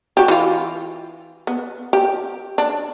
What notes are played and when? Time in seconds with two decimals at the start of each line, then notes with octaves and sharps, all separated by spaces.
0.17 F#4 G4
0.28 E3 F4
1.47 B3
1.93 G4
2.58 D4